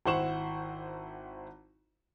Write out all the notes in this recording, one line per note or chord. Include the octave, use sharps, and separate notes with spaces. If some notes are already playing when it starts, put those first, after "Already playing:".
G#1 E4 C5 F#5 C#6 E7